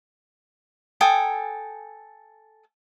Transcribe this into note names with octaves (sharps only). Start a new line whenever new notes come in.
A4 G5 G#5 D#6